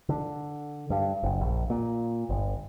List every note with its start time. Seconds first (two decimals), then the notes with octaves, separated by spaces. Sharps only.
0.09 D3
0.90 G2
1.23 F#1
1.41 A#1
1.70 A#2
2.30 G1